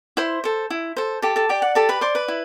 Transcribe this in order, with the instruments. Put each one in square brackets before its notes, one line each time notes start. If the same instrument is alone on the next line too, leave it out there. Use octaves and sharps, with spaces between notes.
[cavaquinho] E4 C5 C6
A4 C5
E4
A4 C5
G4 A4 A5
A4 A5
G4 D5 G5
F#5
G4 A4 A5
B4 B5
C5 D5 C6
B4 B5
E4